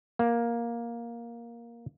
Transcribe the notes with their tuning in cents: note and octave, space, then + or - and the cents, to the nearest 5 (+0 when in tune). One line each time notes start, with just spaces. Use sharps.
A#3 +10